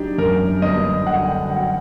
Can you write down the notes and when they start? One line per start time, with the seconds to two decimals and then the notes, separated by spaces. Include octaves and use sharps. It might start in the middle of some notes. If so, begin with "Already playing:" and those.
Already playing: F#3 D4 D#4 G4
0.18 F#2 A#4
0.62 G1 D#5
1.07 D3 F#5
1.28 G5
1.50 F#3 F#5